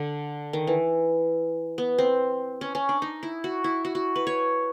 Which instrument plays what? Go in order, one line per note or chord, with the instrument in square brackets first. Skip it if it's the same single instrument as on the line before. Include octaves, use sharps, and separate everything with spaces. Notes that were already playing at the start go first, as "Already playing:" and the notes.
Already playing: [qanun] D3
D#3
E3
B3
C4
C#4
C#4
D4
D#4
E4
F#4
E4
F#4
F#4
B4
C#5